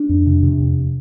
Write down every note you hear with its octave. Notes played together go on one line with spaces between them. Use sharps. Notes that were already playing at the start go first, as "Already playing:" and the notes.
Already playing: D4
F2
C3
C3
F2